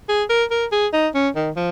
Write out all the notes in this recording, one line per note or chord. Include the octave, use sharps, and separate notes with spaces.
G#4
A#4
A#4
G#4
D#4
C#4
D#3
F3